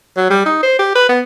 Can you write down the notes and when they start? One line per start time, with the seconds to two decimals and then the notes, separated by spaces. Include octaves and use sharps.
0.17 F#3
0.30 G3
0.46 D#4
0.63 C5
0.79 G4
0.95 B4
1.09 B3